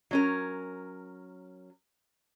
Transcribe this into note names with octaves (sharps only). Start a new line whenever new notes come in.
F#3 C#4 A#4